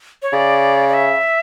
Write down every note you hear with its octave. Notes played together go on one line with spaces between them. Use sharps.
C#5
C#3 D5
D5
E5